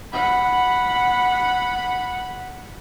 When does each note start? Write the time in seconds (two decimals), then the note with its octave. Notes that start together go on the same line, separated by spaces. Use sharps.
0.13 F#5 B5